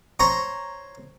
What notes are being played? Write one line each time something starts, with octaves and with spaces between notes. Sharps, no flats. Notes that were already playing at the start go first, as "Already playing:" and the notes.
C5 C#5 A#5